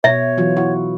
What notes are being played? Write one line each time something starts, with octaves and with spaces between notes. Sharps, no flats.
B2 C#5 E5
E3 F#3 F4
E4 F#4